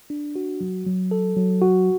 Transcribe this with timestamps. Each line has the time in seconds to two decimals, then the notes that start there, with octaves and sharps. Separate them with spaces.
0.10 D4
0.36 F#4
0.61 F#3
0.86 F#3
1.11 A4
1.37 F#3
1.62 F#4